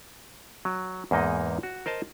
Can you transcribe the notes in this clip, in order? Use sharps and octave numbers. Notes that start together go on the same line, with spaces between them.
F#3
E2 G#2 A#3 D#4 D#5
F#4
A#4 C5 D#5 A5